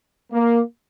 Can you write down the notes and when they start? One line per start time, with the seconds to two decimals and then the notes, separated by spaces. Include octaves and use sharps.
0.32 A#3